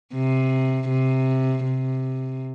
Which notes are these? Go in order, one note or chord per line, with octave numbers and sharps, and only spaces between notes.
C3
C3
C3